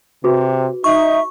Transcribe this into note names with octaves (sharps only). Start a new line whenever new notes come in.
C3 F#4 G#4 B4
D#4 E5 C#6